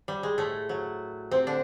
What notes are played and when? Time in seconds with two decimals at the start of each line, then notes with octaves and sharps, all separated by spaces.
0.08 G3
0.23 G#3
0.38 A2 A3
0.69 F#3
1.31 C3 C4
1.47 D3 D4